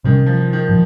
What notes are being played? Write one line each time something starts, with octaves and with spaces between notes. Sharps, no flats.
C3 D#3 G3 A#3 C#4
F3
D#3
A#2 F3